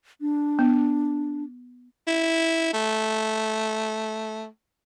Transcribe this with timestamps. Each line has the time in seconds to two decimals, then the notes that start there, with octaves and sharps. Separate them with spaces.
0.21 D4
0.59 B3
2.07 E4
2.74 A3